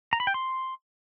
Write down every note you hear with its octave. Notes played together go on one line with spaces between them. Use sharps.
A#5
B5
G5
C6